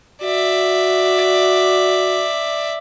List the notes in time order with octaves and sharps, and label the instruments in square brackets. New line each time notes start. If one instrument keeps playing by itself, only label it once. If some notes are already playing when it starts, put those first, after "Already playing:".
[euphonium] F#4 [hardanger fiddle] D5 E5